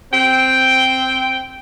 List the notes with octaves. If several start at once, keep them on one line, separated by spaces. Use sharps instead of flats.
C4 G5